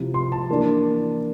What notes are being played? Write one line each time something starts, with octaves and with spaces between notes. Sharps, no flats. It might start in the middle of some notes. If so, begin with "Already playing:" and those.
Already playing: C3 F3 C4 E4
C6
A5
E3 A#3 D4